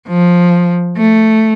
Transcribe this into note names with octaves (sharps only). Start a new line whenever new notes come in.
F3
A3